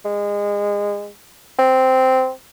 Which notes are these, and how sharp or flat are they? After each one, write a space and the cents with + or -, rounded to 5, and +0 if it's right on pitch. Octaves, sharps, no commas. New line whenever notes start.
G#3 -25
C4 -10